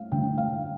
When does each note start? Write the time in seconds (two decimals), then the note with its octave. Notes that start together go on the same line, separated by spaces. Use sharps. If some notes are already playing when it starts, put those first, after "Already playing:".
Already playing: A3 F5
0.12 D3 A3 G5
0.38 F5